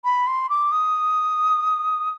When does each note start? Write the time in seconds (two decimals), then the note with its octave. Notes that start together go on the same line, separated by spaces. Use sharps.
0.04 B5
0.27 C6
0.49 D6
0.72 D#6